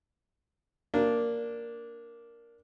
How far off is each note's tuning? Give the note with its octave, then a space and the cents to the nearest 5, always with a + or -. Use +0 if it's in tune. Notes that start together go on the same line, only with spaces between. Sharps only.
A#3 +0 D4 -10